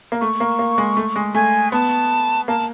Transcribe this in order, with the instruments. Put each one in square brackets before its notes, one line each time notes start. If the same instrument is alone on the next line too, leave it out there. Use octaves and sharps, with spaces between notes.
[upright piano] A#3
[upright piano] A3 [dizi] C#6
[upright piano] A#3
A#3
G#3
A3
G#3
[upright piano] A3 [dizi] G#5
[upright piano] B3 [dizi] A5
[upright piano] A#3 [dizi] A5